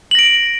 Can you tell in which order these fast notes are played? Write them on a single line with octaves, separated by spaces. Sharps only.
F#7 A#6 D7